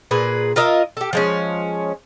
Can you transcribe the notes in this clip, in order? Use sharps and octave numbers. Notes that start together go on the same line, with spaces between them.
A#2 G#4 B4
F4 A#4 D#5 E5
G4 A4
F3 G#3 C#4